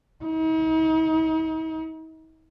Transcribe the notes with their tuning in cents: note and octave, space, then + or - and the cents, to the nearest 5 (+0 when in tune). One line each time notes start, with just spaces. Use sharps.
D#4 +45